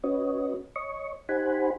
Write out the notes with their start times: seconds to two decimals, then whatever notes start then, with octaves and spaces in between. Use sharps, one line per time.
0.04 C#4 F#4 B4 C#5 D#5
0.76 C#5 D#5 C#6
1.29 D#4 G4 C5 F#5 G#5 B5